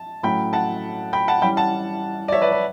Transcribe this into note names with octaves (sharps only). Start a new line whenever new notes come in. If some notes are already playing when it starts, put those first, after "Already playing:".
Already playing: A5
A2 F#3 A3 C#4 G5 B5
F#5 A5
G5 B5
F#5 A5
E3 G3 C#4 G5 B5
F#5 A5
D5
C#5 E5
B4 D5
B4